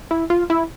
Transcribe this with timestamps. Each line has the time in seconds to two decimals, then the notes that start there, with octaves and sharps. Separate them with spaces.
0.11 E4
0.30 F4
0.50 E4